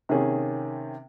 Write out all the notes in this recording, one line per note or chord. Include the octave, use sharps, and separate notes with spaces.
C3 D#3 A#3 C#4 G#4